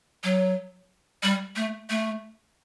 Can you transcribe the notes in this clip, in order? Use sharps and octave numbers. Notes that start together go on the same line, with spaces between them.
F#3
G3
A3
A3